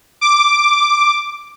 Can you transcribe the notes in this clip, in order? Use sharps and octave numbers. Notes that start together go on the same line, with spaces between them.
D6